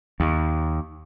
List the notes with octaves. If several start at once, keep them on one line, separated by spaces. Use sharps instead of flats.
D#2